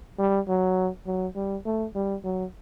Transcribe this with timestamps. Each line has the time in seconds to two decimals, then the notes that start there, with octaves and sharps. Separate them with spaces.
0.19 G3
0.48 F#3
1.06 F#3
1.35 G3
1.65 A3
1.95 G3
2.24 F#3